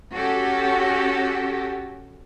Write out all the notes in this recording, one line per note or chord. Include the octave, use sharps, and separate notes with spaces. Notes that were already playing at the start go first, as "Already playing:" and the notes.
C#4 F#4 G4 A4